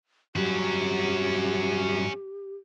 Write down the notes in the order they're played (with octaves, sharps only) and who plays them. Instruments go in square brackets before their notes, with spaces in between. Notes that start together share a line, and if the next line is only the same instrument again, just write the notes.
[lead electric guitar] G2 F#3 [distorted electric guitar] C#4 F#4 [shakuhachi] G4